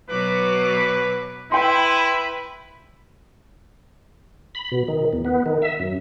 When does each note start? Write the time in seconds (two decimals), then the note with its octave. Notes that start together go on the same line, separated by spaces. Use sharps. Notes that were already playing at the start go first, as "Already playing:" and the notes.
0.10 B2 F#3 B4 D6
1.52 E4 B4 G5 B5 C6
4.55 B5
4.72 B2
4.88 D#3
5.13 E2
5.25 B3
5.46 D#3
5.62 E5
5.80 F#2